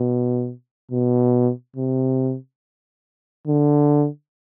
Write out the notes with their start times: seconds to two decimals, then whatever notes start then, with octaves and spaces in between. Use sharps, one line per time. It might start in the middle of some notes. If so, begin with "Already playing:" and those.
Already playing: B2
0.91 B2
1.76 C3
3.47 D3